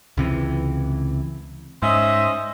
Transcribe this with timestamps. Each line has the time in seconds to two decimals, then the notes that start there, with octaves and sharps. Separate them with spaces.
0.17 C#2 C3 E3
1.83 G#2 C#4 C5 D#5 E5